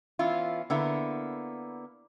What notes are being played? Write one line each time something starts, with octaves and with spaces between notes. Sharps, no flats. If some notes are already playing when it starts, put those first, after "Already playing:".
E3 B3 C#4 E4 F4
D3 A#3 B3 E4